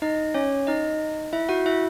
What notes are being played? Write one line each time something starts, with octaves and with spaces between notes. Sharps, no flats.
D#4 D#5
C#4 C#5
D#4 D#5
E4 E5
F#4 F#5
E4 E5